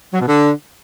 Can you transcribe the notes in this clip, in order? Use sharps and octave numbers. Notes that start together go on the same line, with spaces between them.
F#3
B2
D3